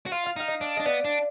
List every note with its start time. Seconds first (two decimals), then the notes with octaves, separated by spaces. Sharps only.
0.06 F#4
0.11 F4 F5
0.26 F5
0.36 D#4 F5
0.48 D#5
0.61 D4
0.77 D4 D#5
0.86 B3 D5
1.04 D4